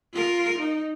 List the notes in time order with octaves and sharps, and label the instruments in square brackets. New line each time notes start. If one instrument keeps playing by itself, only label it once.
[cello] F4 A#4
D#4